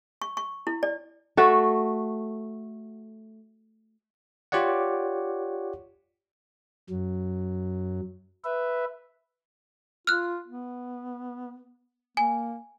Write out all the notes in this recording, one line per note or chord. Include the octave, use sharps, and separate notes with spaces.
C#6
C#6
E4
D5
A3 F#4 A4
F4 G4 C#5 D5 F#5
F#2 F#3
B4 E5
F4 F6 F#6
B3
A#3 G#5